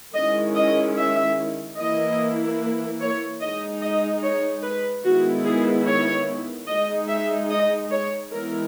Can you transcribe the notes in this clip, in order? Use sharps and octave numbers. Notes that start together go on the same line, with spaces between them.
D#3 G#3 C#4 E4 D#5
D#5
E5
E3 A#3 E4 D#5
C#5
G#3 D#4 D#5
D#5
C#5
B4
D#3 G#3 B3 E4 F#4
G#4
C#5
G#3 D#4 D#5
E5
D#5
C#5
E3 G#3 B3 E4 A#4